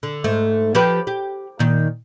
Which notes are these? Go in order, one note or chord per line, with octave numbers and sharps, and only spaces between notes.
D3
G#2 A3
F3 G4 B4
G4
A#2 D#3